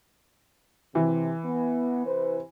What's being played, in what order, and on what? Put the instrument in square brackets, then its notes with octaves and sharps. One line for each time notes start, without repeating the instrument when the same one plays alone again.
[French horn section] C3 [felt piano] E3
[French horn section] B3
C3 B4 C5